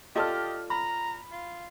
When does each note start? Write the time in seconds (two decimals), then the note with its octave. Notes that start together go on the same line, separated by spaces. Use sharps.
0.15 F4 G4 A4 D5 D#5 A5 F6
0.70 A#5 B5
1.32 F4